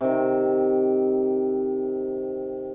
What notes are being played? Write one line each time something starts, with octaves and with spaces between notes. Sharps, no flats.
C3 D#3